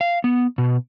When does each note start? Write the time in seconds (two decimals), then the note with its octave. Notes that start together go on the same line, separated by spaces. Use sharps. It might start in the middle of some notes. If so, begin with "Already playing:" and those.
0.01 F5
0.24 B3
0.58 B2